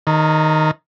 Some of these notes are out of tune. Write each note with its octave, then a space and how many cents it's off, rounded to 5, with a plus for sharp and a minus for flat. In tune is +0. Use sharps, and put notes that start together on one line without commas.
D#3 +0 A#5 -35